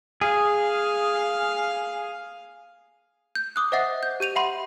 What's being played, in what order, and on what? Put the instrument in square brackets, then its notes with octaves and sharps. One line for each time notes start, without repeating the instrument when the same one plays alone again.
[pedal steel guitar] G#4 [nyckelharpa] F5
[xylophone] G6
D6 D#6 F#6
C5 D#5 E5 F#5 A6 C7
G6
G4 G6 D#7 F7
E5 F#5 B5 C6